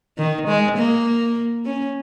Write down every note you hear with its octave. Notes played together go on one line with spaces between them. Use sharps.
D#3
G#3
A#3
C#4